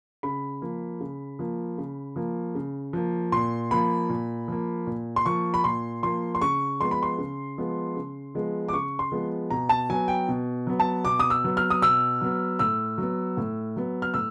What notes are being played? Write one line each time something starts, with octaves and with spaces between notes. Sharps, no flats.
C#3 B5
F3 A#3
C#3
F3 A#3
C#3
F3 A#3
C#3
F3 A#3
A#2 C6
F3 A#3 B5
A#2
F3 A#3
A#2
C6
F3 A#3 C#6
B5
A#2 C6
F3 A#3 C6
C6
C#3 C#6
F3 G#3 B3 C6
B5
C6
C#3
F3 G#3 B3
C#3
F3 G#3 B3
D6
C#3 C#6
C6
F3 G#3 B3
B2 A#5
A5
F#3 B3 G#5
G5
B2
F#3 B3
A5
B2 D6
D#6
E6
F#3 B3
F6
D#6
B2 E6
F#3 B3
A2 E6
F#3 B3
A2
F#3 B3
F6
A2 E6